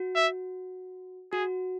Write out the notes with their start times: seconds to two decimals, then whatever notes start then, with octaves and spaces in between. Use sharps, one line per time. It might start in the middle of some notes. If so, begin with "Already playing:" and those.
Already playing: F#4
0.15 E5
1.32 F#4 G#4